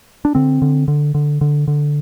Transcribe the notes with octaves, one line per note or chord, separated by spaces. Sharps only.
D4
D3 C4
D3
D3
D3
D3
D3